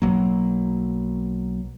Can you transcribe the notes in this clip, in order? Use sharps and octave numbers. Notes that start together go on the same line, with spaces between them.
B1 F#3 A#3